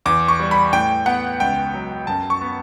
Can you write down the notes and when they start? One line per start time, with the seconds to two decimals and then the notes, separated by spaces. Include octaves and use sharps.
0.06 E2 D6
0.28 C#6
0.40 G3
0.51 B5
0.73 A2 G5
1.06 B3 F#5
1.40 C#2 G5
1.74 F#3
2.07 F#2 A5
2.30 C#6
2.41 B3